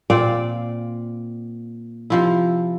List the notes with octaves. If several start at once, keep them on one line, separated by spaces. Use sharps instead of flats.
A#2 C4 D5 F5
C3 F3 E4